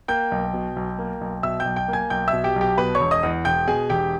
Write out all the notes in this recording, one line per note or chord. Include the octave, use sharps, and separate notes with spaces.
A#3 G5 G6
B1
B2
B1
A#3
B1
B2 E5 E6
G5 G6
B1
G5 G6
A#3
G#5 G#6
B1 G5 G6
E5 E6
B2
G4 G5
B1
G4 G5
B2 B4 B5
C#5 C#6
E1
D#5 D#6
E2
E1 G5 G6
B2 G#4 G#5
E1 G4 G5